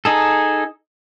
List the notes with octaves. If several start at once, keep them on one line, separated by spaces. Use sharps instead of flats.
D#4 G#4 A4